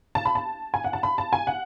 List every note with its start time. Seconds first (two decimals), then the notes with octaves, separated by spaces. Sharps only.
0.15 A5
0.25 B5
0.35 A5
0.74 G#5
0.84 F#5
0.93 A5
1.03 B5
1.18 A5
1.33 G#5
1.47 F#5